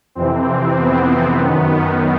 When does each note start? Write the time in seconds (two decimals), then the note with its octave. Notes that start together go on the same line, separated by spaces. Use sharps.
0.15 F2 C3 E3 C4
0.77 B3
1.40 F#2 D#3